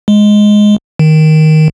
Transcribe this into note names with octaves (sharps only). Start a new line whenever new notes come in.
G#3
D#3